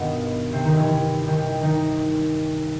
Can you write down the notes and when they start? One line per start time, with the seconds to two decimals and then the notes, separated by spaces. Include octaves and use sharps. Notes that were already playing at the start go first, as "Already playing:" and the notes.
Already playing: G2 B2 D#3 B3
0.53 C3 C4
0.65 D#3 D#4
0.76 E3 E4
0.89 E3 E4
1.26 C2 C3 D#3
1.62 D#3 D#4